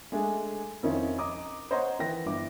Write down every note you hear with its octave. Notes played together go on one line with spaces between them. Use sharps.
G#3 A3 D4 G#4
F2 D#3 C4 C#4 D#4 E4
D#5 A#5 D6 D#6
C5 C#5 D#5 F#5 A#5 C6
D#3 E3 B4 G5 A#6
G1 D4 E4 D6